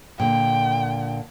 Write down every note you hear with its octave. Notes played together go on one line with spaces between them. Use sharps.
A#2 D3 G5